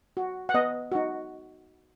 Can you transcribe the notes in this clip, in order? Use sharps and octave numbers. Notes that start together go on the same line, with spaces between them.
F#4
F#5
B3 D#5
D#4 F#4